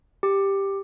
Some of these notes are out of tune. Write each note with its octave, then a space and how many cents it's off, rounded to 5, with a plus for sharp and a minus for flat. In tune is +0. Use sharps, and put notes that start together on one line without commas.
G4 +5